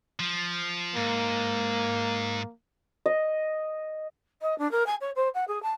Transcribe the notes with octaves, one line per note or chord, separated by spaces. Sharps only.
F3
G#2 A#3
D#5
D#5
D4
A#4
G#5
C#5
C5
F#5
G#4
A5